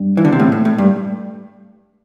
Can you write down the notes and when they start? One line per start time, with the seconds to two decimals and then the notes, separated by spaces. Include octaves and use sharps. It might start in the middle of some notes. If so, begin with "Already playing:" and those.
Already playing: G2
0.17 E3
0.25 D3
0.32 C3
0.40 A2
0.52 A2
0.65 A2
0.78 G2